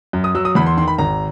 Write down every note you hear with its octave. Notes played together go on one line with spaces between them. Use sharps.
F#2
D#6
F#3 E6
D#6
E2 B5
C6
D#3 C6
B5
G#1 A#5